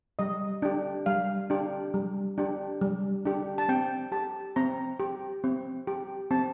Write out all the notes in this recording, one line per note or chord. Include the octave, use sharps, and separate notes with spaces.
G3 D#5
D4 G4
G3 F5
D4 G4
G3
D4 G4
G3
D4 G4
A5
C4 G5
G4 A5
C4 A#5
G4
C4
G4
C4 A5